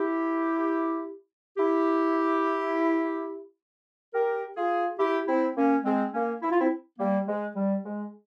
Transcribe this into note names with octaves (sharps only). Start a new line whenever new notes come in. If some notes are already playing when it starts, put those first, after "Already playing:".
Already playing: E4 G4
E4 G4
G4 A#4
F4 G#4
E4 G4
C4 E4
A#3 C#4
G#3 C4
A#3 C#4
E4
F4
C4 E4
G3 A#3
G#3
G3
G#3